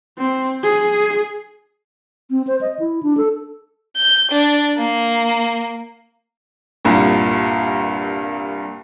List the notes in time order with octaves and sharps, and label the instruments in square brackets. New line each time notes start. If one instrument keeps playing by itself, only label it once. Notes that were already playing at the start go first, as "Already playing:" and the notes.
[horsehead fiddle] C4
G#4
[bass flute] C4
C5
D#5
E4
D4
A4
[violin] G6
D4
A#3
[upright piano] C2 G2 A#2